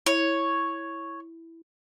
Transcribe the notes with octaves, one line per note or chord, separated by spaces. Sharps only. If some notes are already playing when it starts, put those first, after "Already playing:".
E4 C#5